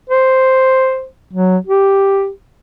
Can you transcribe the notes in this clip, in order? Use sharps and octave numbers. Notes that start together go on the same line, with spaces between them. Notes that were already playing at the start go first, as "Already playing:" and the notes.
C5
F#3
G4